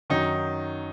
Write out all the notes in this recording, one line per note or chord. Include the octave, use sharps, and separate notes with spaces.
F#2 D#3 F#3 D#4